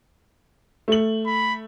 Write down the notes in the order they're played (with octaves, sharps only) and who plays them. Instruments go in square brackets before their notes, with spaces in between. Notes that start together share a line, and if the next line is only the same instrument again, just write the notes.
[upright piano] A3 F#7
[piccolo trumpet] B5